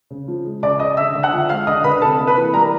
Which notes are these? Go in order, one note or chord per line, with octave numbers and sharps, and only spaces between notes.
C#3
F3
G#3
C#3 D5 D6
C#3 D#5 D#6
D3 E5 E6
D3
F#5 F#6
F3
G#3 F5 F6
D3 D#5 D#6
D3 B4 B5
C3 A4 A5
A#3
B4 B5
E3
G3 A#4 A#5